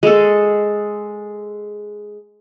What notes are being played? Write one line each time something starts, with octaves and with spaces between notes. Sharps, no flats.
G#3 A4